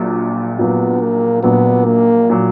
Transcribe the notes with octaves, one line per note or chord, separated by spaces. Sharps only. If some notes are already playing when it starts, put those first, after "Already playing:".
Already playing: A#1 A#2 F#3
A#1 A#2 F#3 B3
A#3
A#1 A#2 F#3 B3
A#3
A#2 F#3